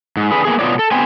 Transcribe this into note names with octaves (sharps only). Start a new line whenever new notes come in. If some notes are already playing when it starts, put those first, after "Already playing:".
G#2
D3 G#4 B4
A#3 B3 G#4
B2 B3 F4 G4 C#5 D5
A4
B3 C4 G4 C5 G#5